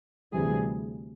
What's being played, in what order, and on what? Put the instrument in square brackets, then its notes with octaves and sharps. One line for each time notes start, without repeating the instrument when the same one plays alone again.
[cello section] D2 C3 E3 G3 G#4